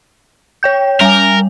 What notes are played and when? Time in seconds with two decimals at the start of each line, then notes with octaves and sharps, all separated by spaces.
0.63 C#5 G5 G6
1.01 G3 A#4 G#5